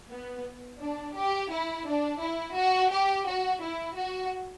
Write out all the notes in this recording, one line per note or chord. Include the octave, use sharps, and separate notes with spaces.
B3
D4
G4
E4
D4
E4
F#4
G4
F#4
E4
F#4